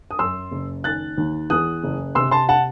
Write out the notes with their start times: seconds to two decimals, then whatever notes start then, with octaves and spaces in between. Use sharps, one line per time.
0.11 D#6
0.19 F#2 C6 E6
0.51 F#1
0.84 D#3 F#6 A6
1.17 D#2
1.50 E2 D#6 F#6
1.84 F#1
2.15 C3 C6 E6
2.31 A5 C6
2.49 F#5 A5